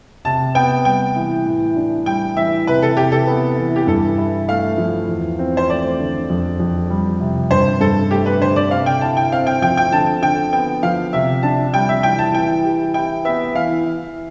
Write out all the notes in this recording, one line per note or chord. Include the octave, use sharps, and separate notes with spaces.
C3 A5
B3 G5
G3 G5
E3
A2
D4
G3 G5
E3 E5
C3 B4
A4
C3 G4
A4
B3
E3
G4
G2 A4
E4
A3 F5
F3
E2
C4
C5
A3 D5
D3
F2
F2
G3
C3
G2 C5
G2 A4
A3 G4
B4
D3 C5
D5
C3 F5
G5
E4 A5
G5
C4 F5
G5
F3 G5
G5
D3 A5
D3 G5
B3 G5
F3 F5
C3 E5
D4 A5
G3 G5
E5
E3 G5
A5
E3 G5
G4
E4 G5
B3 E5
E3 F5
E3